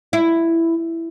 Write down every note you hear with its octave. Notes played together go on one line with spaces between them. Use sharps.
E4